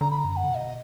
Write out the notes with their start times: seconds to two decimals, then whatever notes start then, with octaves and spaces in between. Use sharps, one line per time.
0.01 D3 A#5
0.11 B5
0.18 A#5
0.24 F#2
0.37 F#5
0.44 D3
0.49 B2
0.55 D#5